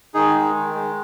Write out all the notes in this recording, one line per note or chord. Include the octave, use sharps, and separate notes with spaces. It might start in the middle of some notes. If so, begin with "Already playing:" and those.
D#3 D#4 G#4
G#3
D#3
G#3